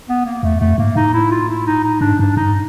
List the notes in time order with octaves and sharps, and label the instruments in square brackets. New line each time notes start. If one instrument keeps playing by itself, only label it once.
[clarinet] B3
A#3
[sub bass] E2 [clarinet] A3
[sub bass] F2 [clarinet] A3
[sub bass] G#2 [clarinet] A#3
[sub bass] A2 [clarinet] D#4
[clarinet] E4
F4
E4
D#4
D#4
[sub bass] G#2 [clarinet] D4
[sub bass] G2 [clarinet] D4
[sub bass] G2 [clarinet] D#4